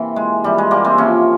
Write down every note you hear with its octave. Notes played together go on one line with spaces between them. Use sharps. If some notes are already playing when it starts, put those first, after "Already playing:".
Already playing: C3 E3 A#3
G#3
C3 E3 G3
G#3
G3 A#3
G#3 C4
C3 F3 A#3 C#4